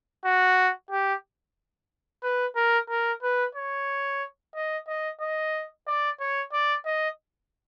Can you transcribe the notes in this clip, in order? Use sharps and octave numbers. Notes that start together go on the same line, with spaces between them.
F#4
G4
B4
A#4
A#4
B4
C#5
D#5
D#5
D#5
D5
C#5
D5
D#5